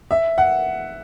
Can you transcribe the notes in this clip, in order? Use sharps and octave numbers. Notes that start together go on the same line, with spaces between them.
E5
F#5